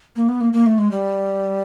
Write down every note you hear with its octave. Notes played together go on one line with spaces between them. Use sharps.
A#3
B3
A#3
A#3
A3
G#3
G3